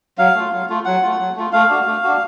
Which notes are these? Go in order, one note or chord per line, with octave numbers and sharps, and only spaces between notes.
F#3 F5
A3 F4
F#3
A3 F4
F#3 F#5
A3 F4
F#3
A3 F4
A3 F5
D4 F#4
A3
D4 F#4